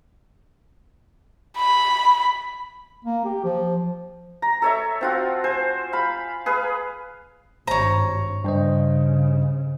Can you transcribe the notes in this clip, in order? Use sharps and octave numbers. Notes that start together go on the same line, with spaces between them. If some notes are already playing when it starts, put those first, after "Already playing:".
B5
A#3
G4
F3
A#5
A4 C#5 E5
C4 F4 F#4
C5 G#5
F5 B5
G#4 B4 F5
G#1 G2 C5 C#5 A#5
G2 C#3 C5 D#5